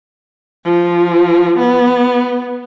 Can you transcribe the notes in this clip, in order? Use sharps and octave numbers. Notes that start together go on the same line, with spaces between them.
F3
B3